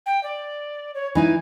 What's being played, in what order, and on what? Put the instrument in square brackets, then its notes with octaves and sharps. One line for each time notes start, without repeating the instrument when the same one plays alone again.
[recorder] G5
D5
C#5
[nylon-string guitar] E3 D#4 E4 [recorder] G#5